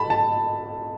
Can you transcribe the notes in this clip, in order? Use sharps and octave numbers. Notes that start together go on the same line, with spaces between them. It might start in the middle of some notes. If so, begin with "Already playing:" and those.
Already playing: A5 B5
A5